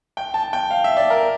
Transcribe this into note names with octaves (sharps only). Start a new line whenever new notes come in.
G5
A5
G5
F5
E5
D5
A#4